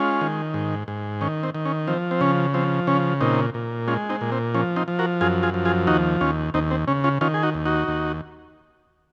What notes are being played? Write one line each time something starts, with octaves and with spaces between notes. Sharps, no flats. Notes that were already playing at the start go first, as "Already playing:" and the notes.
Already playing: G#3 C#4 F4
D#3
G#2
G#2
D#3 C#4
C4
D#3
C#4
F3 C4
C4
C#3 C#4
F3 C4
C#3 C#4
A#2 C4 D#4
A#2
G#3 C#4 F4
C4 D#4
A#2
C4
F3 C#4
C4 D#4
F3
F#4 A#4
F#2 F4 G#4
F4 G#4
F3
F4 G#4
D#2 D#4 F#4
D#2 C#4 F4
D#2 C4 D#4
C4
C#3 C#4
C#4 F4
D#3 C#4 F4
G#4
D#4 F#4
D#2
D#4 F#4
D#2